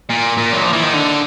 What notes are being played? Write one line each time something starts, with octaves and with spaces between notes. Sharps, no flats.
A#2
A#2
F#3
F3
E3
D#3
D3